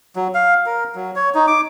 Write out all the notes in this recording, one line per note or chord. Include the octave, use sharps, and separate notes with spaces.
F#3
F5
A#4
F#3
C#5
D#4
D6